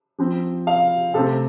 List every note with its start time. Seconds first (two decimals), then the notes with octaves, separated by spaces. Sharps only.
0.19 F3 C4
0.67 F5
1.14 C3 A3 C4 A4